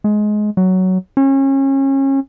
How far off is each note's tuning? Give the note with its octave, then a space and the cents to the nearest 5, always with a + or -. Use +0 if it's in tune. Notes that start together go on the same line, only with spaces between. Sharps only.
G#3 +20
F#3 +10
C#4 -30